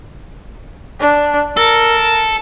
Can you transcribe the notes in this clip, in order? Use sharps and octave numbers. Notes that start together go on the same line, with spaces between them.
D4
A4 A#4